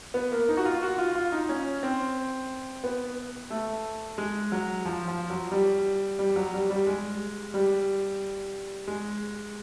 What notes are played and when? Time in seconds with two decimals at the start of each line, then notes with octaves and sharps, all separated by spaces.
0.14 B3
0.32 A#3
0.49 D#4
0.57 F#4
0.65 F4
0.82 F#4
0.98 F4
1.15 F4
1.32 D#4
1.49 C#4
1.83 C4
2.84 B3
3.50 A3
4.18 G#3
4.52 F#3
4.85 F3
5.08 F3
5.30 F#3
5.52 G3
6.19 G3
6.36 F#3
6.54 G3
6.70 G3
6.87 G#3
7.54 G3
8.87 G#3